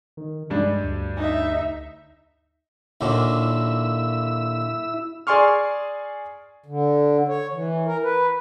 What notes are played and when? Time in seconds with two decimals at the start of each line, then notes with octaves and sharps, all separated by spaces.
0.17 D#3
0.50 G2 G#3 D4
0.83 D2
1.17 D#4 E5
3.01 D#2 A#2 D3 E4 E6
5.27 G#4 D5 G#5 C6 C#6 F6
6.66 D3
7.28 C#5
7.52 E3
7.86 A#4
8.03 B4